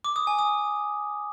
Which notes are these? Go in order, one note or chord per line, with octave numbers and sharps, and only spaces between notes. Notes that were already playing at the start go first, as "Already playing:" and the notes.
D6
D#6
G#5
D#6